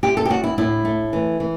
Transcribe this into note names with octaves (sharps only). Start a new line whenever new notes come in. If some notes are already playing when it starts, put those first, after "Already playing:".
D2 G4
A4
G4
D2 F#4
E4
A2 E4
A3
E3
E3